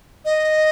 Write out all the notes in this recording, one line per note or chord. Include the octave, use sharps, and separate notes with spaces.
D#5